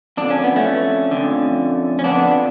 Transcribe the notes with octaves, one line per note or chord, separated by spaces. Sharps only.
F2 D3 D4
C#4
B3
A3 C#4
F2 D3
C#4
F2 D3 B3 D4